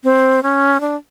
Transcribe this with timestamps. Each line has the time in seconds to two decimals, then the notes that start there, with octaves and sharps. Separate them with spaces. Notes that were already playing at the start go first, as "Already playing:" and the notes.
0.04 C4
0.43 C#4
0.81 D4